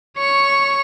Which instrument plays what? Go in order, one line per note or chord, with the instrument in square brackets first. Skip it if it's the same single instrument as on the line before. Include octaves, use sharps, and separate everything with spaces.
[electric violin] C#5 C#6